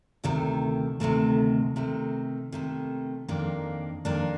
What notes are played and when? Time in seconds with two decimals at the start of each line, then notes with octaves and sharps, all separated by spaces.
0.24 D2 C3 D#3 A3
1.00 D2 C3 D#3 A3
1.76 C3 D#3 A3
2.52 C3 D#3 A3
3.28 F2 D#3 A#3 D4
4.05 F2 D#3 A#3 D4